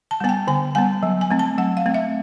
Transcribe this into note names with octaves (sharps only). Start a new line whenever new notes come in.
A5
G3 B3 G#5
G5
D3 G#5
G3 B3 G#5
F#3
G#5
A3 C4
A5
F#3 F#5
F5
A3 C4
E5